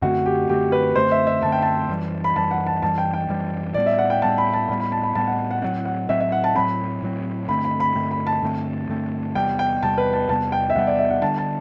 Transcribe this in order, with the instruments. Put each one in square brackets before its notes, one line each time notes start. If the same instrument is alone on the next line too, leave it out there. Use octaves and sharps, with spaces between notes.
[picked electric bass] F#2 D3 A3 C4 [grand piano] F#4
[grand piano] G4
[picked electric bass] F#2 D3 A3 C4 [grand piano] G4
[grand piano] B4
[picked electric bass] F#2 D3 A3 C4 [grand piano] C5
[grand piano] E5
E5
[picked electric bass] F#2 D3 A3 C4 [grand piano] A5
[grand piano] G5
A5
[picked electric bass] F#2 E3 G3
[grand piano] B5
[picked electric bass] F#2 E3 G3 [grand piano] A5
[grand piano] F#5
A5
[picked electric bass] F#2 E3 G3 [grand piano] A5
[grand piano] G5
G5
[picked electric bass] F#2 E3 G3
[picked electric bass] A2 G3 B3 [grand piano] D5
[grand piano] E5
F#5
G5
[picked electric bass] A2 G3 B3 [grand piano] A5
[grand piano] B5
A5
[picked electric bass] A2 G3 B3 [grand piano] B5
[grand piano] B5
A5
B5
[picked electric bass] A2 G3 B3 [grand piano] A5
[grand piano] F#5
F#5
[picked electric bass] A2 F#3 C4 [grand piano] F#5
[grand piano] F#5
[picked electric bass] A2 F#3 C4 [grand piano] E5
[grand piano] E5
F#5
A5
[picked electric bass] A2 F#3 C4 [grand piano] B5
[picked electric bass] A2 F#3 C4
[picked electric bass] G2 D3 A3 C4 [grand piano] B5
[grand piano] B5
B5
[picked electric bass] G2 D3 A3 C4
[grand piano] B5
A5
[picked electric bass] G2 D3 A3 C4
G2 D3 A3 C4
[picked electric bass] E2 C3 G3 B3 [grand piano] G5
[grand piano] G5
[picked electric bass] E2 C3 G3 B3 [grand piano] A5
[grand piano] B4
A5
[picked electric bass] E2 C3 G3 B3 [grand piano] A5
[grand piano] G5
E5
[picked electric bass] E2 C3 G3 B3 [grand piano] F#5
[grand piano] D5
E5
F#5
[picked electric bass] D3 G3 B3 D4 [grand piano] A5
[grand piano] A5